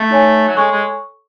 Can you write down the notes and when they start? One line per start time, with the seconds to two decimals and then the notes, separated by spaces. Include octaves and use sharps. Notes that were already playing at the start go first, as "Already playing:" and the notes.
Already playing: A3
0.10 D#4 A4 C#5 G#5 B5
0.48 F#3
0.56 G#3 A4 C#5 G#5 C#6
0.71 G#3